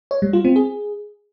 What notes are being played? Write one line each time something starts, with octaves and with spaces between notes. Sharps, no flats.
C#5
G3
F4
C4
G#4